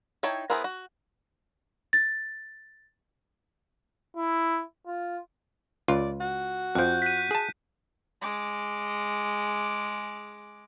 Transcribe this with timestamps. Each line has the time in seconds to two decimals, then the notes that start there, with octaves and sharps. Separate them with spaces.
0.23 D#4 E4 C#5 G5 A5
0.50 B3 E4 G#4 A#4 C5
0.64 F#4
1.93 A6
4.16 E4
4.87 F4
5.88 C#2 F4 D5
6.20 F#4
6.75 F2 F3 F#6 G6
7.02 B6 D#7
7.31 G#4 A5
8.21 G#3 D6